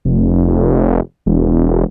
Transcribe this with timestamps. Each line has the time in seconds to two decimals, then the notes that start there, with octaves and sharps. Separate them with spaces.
0.05 F1
1.26 E1